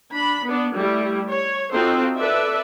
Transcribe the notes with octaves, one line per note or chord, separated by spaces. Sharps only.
D4 B5
B3 D4
G3 A3 E4
C#5
C4 D#4 F4 F#4 A4 C5
A4 B4 D5 E5